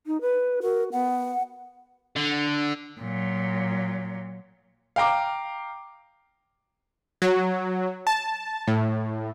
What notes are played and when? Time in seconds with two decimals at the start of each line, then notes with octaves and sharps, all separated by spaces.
0.07 D#4
0.21 B4
0.63 F#4 A#4
0.92 B3 F#5
2.16 D3
3.00 A#2 F#3
4.96 F5 G5 A#5 D6
7.22 F#3
8.07 A5
8.68 A2